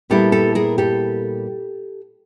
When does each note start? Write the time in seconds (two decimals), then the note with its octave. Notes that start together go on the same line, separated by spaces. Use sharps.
0.10 A#2 G3 B3 E4 G4 A4
0.32 G4 A4
0.55 G#4 A#4
0.78 G4 A4